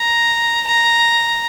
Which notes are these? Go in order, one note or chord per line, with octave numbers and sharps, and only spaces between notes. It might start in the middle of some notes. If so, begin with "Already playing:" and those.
Already playing: A#5
A#5